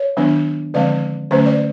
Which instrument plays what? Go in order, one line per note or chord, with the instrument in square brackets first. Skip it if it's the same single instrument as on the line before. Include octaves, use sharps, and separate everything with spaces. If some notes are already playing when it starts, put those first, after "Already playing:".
Already playing: [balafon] C#5
D#3 F#3 B3 D4
D3 F3 G#3 C4 D5
D3 F#3 A3 C#4 C5
D5